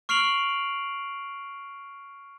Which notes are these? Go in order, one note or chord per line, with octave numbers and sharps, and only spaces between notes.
C#6 F6 C7 D7 F7 F#7